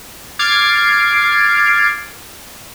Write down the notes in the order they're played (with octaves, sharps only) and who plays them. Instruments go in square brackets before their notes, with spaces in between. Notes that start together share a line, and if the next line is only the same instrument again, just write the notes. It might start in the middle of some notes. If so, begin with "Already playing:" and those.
[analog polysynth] D6 F6 G#6 A6 C7 D7